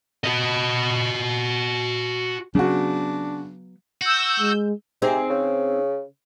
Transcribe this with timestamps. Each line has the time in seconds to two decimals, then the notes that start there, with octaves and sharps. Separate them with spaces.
0.24 F#4 D#5
2.55 C#3 F#3 B3 D4 F#4
4.01 F#4 E6 G6
4.40 G#3
5.02 C3 C4 D#4 G#4
5.30 C#3